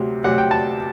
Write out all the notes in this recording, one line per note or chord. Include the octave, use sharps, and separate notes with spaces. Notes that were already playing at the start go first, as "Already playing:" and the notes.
Already playing: D2 C3 F#3
D2 C3 F#3 F#5
G5
A5